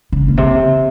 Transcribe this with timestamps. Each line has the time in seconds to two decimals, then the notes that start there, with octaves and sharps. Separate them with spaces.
0.12 C#3
0.28 A#2
0.37 C3